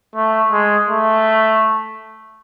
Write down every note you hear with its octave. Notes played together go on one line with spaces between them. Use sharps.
A3
G#3
A3